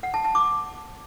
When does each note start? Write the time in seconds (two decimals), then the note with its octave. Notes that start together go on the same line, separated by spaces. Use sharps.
0.03 F#5
0.14 A5
0.24 A5
0.35 D6